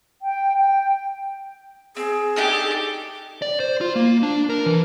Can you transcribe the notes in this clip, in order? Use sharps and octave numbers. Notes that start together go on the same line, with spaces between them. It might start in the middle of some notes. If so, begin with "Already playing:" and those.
G5
G5
C4 G#4
D4 D#4 G4 A4 D6
D5
C5
F4
A#3
D4
A#4
E3